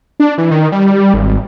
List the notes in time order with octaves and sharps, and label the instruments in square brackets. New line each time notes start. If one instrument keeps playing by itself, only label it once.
[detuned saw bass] D4
E3
D#3
G3
G#1